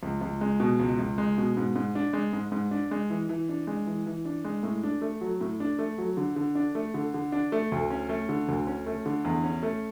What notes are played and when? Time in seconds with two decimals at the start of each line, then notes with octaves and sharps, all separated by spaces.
0.03 C#2
0.21 C#2
0.41 G#3
0.60 B2
0.79 C#2
0.99 C#2
1.18 G#3
1.38 B2
1.57 G#2
1.76 G#2
1.95 D4
2.13 G#3
2.33 G#2
2.52 G#2
2.71 D4
2.91 G#3
3.10 E3
3.29 E3
3.49 D4
3.67 G#3
3.87 E3
4.06 E3
4.25 D4
4.45 G#3
4.63 A2
4.83 D4
5.02 A3
5.21 F#3
5.41 A2
5.60 D4
5.79 A3
5.98 F#3
6.17 D3
6.36 D3
6.55 D4
6.75 A3
6.94 D3
7.14 D3
7.32 D4
7.52 A3
7.72 D2
7.90 C#4
8.09 A3
8.29 D3
8.48 D2
8.67 C#4
8.87 A3
9.06 D3
9.25 E2
9.44 C#4
9.63 A3